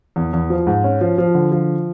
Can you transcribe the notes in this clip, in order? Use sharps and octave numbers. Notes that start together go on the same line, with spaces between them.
E2
E2
F3
G#2
C#4
F3
F3
D3
F3